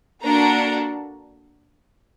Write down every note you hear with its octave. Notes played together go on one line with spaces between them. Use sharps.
A#3 D4 F#4 A4 A#5